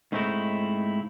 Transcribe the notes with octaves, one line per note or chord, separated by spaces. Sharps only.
G#2 C#3 A3 C4 D#4 E4